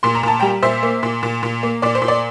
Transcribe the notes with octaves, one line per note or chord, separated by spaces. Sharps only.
A#2 C6
A#5
A#2 A5
G3 G5 A#5
A#2 C5 E5
A#3
A#2
A#2
A#2
A#3
A#2 D5
C5
A#2
D5